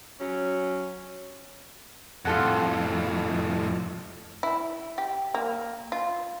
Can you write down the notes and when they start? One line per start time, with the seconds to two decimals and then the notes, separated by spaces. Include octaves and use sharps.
0.20 F#3 C#4
2.25 F2 A2 F4 A4 F#5
4.43 E4
4.98 G4
5.34 A#3
5.92 F4